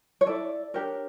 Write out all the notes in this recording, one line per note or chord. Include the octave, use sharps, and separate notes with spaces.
C#5
E4 A4 D5
D4 G4 A#4 C#5